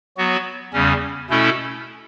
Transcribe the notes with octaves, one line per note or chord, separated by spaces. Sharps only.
F#3 B3 F#4
E2 C#3 G3 C#4
B2 A3 C#4 E4 A4